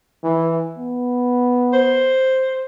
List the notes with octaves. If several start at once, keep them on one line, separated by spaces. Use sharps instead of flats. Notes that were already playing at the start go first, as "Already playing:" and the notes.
E3
B3
C5